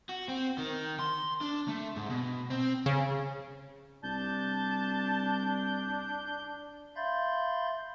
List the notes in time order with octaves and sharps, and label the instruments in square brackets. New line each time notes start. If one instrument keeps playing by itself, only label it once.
[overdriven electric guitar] F#4
C4
D#3
C6
D4
A3
G#2
B2
C4
[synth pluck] C#3
[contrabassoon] C2 [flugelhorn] D4 [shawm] A5 [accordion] G6
[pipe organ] E5 F5 B5 C6 G6 A6